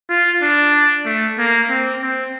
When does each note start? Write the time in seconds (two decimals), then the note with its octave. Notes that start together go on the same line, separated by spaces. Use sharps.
0.09 F4
0.42 D4
1.05 A3
1.38 A#3
1.69 C4
2.02 C4